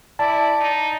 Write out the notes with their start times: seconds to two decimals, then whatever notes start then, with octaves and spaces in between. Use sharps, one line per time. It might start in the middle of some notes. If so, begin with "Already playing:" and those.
0.19 E4 D5 A5
0.61 D#4